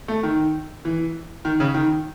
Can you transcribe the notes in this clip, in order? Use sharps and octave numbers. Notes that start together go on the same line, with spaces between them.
A3
D#3
E3
D#3
C#3
D#3